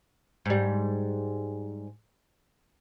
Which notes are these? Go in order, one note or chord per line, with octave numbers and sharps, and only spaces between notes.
G#2 G3